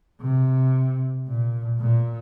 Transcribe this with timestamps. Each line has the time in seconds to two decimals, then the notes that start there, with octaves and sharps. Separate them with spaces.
0.21 C3
1.28 A#2
1.80 A#2